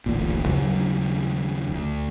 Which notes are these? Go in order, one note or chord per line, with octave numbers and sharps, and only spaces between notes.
D#1 A1 D2 A#2
D#2 C#3 F#3
D2